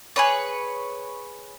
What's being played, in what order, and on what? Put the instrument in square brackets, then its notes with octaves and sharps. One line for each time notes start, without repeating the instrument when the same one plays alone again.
[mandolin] G#4 B4 C#5